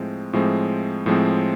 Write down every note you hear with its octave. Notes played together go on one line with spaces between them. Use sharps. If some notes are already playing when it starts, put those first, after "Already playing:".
Already playing: A2 F3 G#3 C4
A2 F3 G#3 C4
A2 F3 G#3 C4